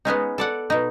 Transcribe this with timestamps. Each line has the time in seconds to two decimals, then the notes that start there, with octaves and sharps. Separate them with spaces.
0.05 G#3 B3 C#4 D#4
0.38 A4 D5 F#5
0.70 B2 D#4